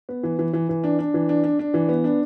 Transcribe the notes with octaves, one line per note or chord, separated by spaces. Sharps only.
B3
E3
E3
E3
E3
D4
D4
E3
D4
D4
D4
E3
B3
D4